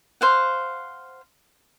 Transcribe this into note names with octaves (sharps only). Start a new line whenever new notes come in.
C5 F5 F#5